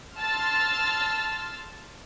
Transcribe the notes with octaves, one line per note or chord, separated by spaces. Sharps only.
A5 C6 E6 F6 A6